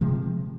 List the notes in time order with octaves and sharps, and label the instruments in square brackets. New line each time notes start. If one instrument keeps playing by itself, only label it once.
[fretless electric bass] C3 F3 G#3